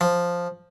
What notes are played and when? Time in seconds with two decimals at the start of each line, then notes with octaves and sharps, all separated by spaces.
0.01 F3